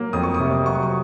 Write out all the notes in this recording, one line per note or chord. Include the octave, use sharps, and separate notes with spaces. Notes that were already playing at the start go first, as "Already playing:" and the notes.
Already playing: F#3 A#3
F2 D#6
C#6
D#6
C3
F#3 C#6
D#6
C#6